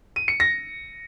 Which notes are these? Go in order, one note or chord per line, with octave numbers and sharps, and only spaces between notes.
D#7
C#7
A#6